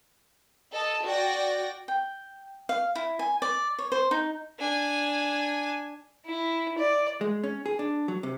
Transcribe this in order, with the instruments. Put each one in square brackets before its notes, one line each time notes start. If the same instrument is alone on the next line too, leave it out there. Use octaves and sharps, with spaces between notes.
[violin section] A4 D#5 A5
F#4 D5 G5 A#6
[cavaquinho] G5
F5
E4
G#5
D5
C#5
C5
D#4
[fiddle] D4 G#5
[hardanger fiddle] E4
D5
[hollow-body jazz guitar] G#3
C#4
G#4
D4
F#3
C3